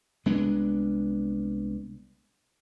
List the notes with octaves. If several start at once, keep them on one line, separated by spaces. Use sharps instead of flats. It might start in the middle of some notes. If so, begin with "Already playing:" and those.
C2 G#3 B3 D4